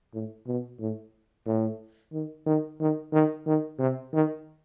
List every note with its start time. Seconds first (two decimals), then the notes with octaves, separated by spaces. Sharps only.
0.14 A2
0.47 B2
0.80 A2
1.46 A2
2.13 D#3
2.46 D#3
2.80 D#3
3.13 D#3
3.47 D#3
3.79 C3
4.13 D#3